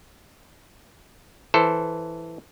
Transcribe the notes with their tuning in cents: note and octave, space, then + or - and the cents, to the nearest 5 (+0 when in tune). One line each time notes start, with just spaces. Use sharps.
E3 +0 A4 +0 C5 +0